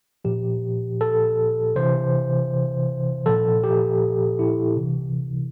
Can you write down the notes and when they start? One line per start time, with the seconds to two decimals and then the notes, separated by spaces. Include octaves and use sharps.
0.25 A#2 F3 G4
1.01 A4
1.76 C3 E3 C5
3.26 A#2 F3 A4
3.64 G4
4.39 E4
4.76 C3 E3